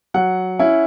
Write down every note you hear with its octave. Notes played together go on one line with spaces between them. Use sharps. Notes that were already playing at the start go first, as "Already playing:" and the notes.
F#3 F#5
C#4 E4